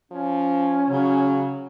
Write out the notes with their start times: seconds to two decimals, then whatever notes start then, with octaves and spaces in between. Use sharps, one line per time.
0.12 F3 C#4
0.90 C#3 F#3